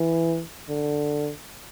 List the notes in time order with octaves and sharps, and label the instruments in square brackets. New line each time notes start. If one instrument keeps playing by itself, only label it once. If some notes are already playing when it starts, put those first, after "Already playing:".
Already playing: [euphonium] E3
D3